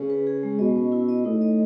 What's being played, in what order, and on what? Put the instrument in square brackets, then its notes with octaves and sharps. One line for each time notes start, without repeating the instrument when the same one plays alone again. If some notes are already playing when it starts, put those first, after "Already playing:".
Already playing: [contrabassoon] C#3
[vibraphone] B4
G#4
G#3
[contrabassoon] B2 [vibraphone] D#5
[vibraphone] C#4
E4
D#5
[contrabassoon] A2 [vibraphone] D#4
[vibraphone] D#5